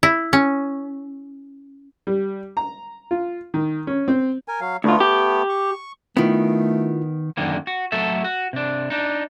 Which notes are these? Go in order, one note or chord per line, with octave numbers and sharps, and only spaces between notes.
E4
C#4
G3
A#5
F4
D#3
C#4
C4
A#4 G#5
F#3 F5
D2 A3 B3 F4
G4
C#6
D#3 A3 B3 E4 F4
F#2 D3 D#3 A#3
F#4
F#3 A3 F#4 A4 E5
F#4
C3 D4
D4 D#4